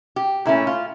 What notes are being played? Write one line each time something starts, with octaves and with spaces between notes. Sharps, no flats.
G4
A#2 A3 C#4 E4
F4